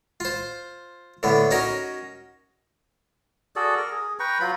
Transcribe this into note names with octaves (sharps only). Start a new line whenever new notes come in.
F4 C5
A2 D3 B3
C#4 D#4 F#4 A#4 C#5
F#4 G#4 A4 D5
A#4
G#4
B4 G5 A#5 C#6
F#3 F4 A#5 B5